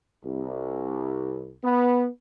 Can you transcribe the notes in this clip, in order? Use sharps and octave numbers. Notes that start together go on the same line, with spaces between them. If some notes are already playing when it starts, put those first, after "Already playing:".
C2
B3